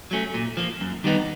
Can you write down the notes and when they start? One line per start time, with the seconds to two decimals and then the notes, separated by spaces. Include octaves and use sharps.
0.11 F#3 A3 C#4
0.34 A#2
0.57 F3 A#3
0.81 F#2
1.04 D#3 G3 B3 D#4